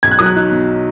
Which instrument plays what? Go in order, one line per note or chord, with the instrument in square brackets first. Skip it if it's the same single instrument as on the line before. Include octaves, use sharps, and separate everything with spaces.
[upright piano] B1 [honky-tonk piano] G#6
[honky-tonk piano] F#6
[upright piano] F#3 [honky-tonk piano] D#6
[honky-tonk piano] F#6
[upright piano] D#4
B2